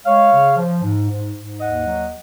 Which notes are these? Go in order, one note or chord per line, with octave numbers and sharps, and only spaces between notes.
G#3 C#5 F5
C#3
F3
G#2
G#2
G#2
D#2 D#5 F#5
F#3